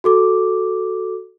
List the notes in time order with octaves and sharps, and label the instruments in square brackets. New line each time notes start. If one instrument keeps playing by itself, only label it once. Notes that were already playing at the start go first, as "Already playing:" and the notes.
[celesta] F#4 A4 D6